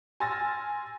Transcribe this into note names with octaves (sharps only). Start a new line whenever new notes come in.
G#5 C6 E6 F6 A6 A#6